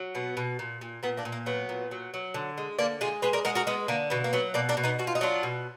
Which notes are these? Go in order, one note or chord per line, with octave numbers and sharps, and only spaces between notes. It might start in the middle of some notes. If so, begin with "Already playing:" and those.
Already playing: F#3
B2 B3
B2
A#2
A#2
A#2 B3
A#3 D4
A#2
A#3
F#3 B3
A#2
F#3
F#3
D3
G#3
D3 A#3 D4
G#3 F4 G#4
G#3 G#4 B4
A#4 D5
G#3 F#4 A#4
F#4 A#4
G#3 B3
D3 A#3
B2 B3
A#3
F#3 B3
B2 A#3 D4
A#3 D4
B2
B3 D#4
B2 F#4
F4
D#4
F#3 D4 F4
B2